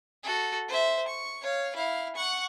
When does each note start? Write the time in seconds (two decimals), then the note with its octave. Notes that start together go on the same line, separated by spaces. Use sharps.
0.24 F#4 A4
0.69 C5 E5
1.08 C#6
1.42 C#5 F5
1.75 E4 F5
2.16 F#5 C#6